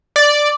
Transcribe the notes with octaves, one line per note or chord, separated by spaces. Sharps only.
D5